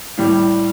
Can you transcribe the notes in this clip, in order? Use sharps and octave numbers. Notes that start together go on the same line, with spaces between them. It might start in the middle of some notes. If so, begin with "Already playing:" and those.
A2 G3